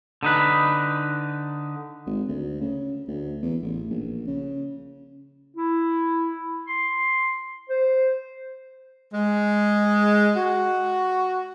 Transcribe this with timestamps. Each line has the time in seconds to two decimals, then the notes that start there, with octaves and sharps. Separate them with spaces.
0.23 D3 D#4 B4
2.06 G#1
2.28 D2
2.61 C#3
3.08 D2
3.42 E2
3.63 A1
3.90 A#1
4.27 C#3
5.57 E4
6.67 C6
7.69 C5
9.13 G#3
10.36 F#4